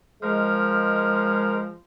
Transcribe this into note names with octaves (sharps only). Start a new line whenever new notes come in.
F3 G#3 A#4